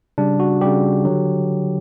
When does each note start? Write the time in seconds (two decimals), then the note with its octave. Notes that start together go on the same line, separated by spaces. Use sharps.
0.18 C#3 G3 D4
0.40 F#4
0.61 C#3 G3 G4
1.05 D3 F#3